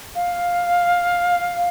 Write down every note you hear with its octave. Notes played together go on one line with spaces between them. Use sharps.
F5